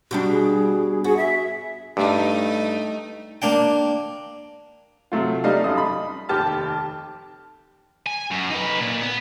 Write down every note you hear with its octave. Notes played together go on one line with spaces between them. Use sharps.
B2 G3 D4
G#4
B3 F#4 G#4
E5
G2 A3 D#4
A#3 D4 G5
C3 F#3 A3 F4
G3 A3 D#4 F5
F1 F#2 D#5 D#6
B5
F1 D#2 G4 A5 F6
G#5
F#2
D#4 B4
A#2
B3